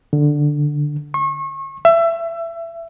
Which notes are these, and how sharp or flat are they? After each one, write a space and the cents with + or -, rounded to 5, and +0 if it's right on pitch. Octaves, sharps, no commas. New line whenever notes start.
D3 +5
C#6 -35
E5 +25